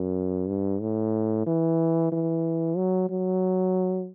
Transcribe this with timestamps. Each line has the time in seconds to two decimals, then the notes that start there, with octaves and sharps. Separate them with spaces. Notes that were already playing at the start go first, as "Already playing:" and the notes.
Already playing: F#2
0.48 G2
0.81 A2
1.46 E3
2.12 E3
2.77 F#3
3.10 F#3